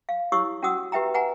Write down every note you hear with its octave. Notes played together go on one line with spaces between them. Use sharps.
F5
E4 G4 C#5 C#6 D#6 E6
C#4 F#4 F#5 D#6 E6
G4 B4 E5 G5 A#5
B4 F#5 G#5 A#5